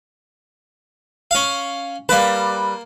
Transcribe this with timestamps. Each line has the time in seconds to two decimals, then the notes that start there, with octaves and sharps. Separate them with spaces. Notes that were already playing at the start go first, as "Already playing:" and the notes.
1.31 C#4 F5
2.09 G3 A#3 B4 A5